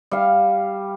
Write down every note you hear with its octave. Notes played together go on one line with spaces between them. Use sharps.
G3 F5